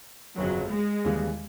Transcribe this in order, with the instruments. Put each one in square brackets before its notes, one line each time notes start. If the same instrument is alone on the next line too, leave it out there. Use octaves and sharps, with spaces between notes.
[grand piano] G1 F2 C#3 [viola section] F#3
[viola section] G#3
[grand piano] D#2 C#3 E3 G3